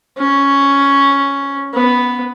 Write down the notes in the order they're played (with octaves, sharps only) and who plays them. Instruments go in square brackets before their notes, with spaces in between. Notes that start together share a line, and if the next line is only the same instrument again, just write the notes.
[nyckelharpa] C#4
B3